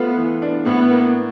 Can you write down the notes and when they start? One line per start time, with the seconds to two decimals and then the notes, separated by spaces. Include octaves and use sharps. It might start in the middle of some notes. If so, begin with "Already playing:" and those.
Already playing: A3 B3 F4
0.17 E3
0.42 D4
0.66 A2 B3
0.90 A#3